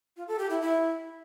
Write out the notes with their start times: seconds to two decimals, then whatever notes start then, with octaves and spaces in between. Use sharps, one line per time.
0.17 F4
0.28 A4
0.39 G4
0.50 E4
0.61 E4